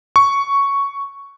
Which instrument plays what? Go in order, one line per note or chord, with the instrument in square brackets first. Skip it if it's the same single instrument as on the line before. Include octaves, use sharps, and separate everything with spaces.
[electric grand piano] C#6